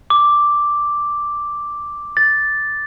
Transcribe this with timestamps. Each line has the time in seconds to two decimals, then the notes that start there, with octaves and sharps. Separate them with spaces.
0.10 D6
2.17 A6